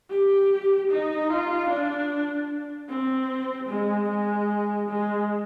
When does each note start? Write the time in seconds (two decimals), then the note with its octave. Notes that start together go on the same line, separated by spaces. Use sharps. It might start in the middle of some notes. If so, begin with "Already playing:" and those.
0.10 G4
0.91 D#4
1.30 F4
1.70 D4
2.90 C4
3.69 G#3
4.10 G#3
4.89 G#3